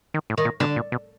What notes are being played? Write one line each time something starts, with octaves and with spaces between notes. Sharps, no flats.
D#3
A2
D#3
A#2
B2 D3
A#2
B2